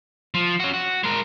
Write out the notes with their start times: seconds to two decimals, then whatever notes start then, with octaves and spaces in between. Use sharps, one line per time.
0.34 F3
0.60 C#4 F#4
0.74 F#4
1.04 G#3 A#4